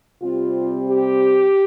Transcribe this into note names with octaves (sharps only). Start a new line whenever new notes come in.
C3 G3 C4 F4
G4